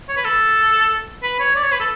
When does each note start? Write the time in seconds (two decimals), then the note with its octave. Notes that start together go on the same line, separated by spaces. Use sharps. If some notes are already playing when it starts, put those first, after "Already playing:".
0.09 C#5
0.17 B4
0.25 A4
1.23 B4
1.40 C#5
1.56 D5
1.63 C#5
1.72 B4
1.80 A4